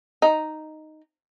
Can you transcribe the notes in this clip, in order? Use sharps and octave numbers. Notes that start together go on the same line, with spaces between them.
D#4